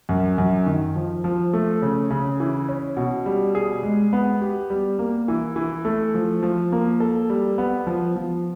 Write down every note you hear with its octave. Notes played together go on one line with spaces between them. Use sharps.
F#2
F#2
D#3
F3
F3
A3
C#3
C#3
E3
C#4
B2
G3
G#4
G#3
B3
G4
G3
A#3
E3
E3
A3
F3
F3
A#3
A4
G3
B3
F3
F3